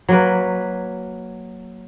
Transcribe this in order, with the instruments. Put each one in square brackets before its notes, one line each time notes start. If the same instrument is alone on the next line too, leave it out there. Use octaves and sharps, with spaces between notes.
[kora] F#3 A#3 B4